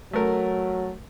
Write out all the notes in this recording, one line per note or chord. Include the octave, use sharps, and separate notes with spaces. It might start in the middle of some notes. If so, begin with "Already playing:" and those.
F#3 A3 A#4